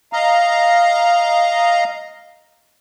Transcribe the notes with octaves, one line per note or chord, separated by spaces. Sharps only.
D#5 F5 A#5